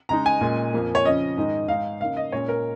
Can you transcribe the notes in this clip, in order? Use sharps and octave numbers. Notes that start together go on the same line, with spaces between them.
C#3 G#3 D#4 A#5
G#5
A#2 G#3 C#4
F2 F3 A#3
C#5
C#3 F3 C#4 D#5
G#2 D#3 G#3 D#4
G#2 G#3 D#4 F5
C#3 A#3 D#4 F5
D#5
A#2 G#3 C#4 C#5
A#4